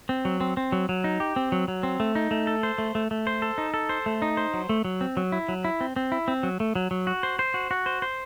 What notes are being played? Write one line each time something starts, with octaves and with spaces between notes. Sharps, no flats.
C4
F#3
C4
C4
F#3
F#3
D#4
G4
C4
F#3
F#3
C4
A3
D#4
A3
A4
C5
A3
A3
A3
C5
A4
D#4
A4
C5
A3
D#4
C5
F#3
A3
F#3
C4
F#3
E4
F#3
E4
C4
C4
E4
C4
F#3
A3
F#3
F#3
F#4
C5
C5
F#4
F#4
C5
C5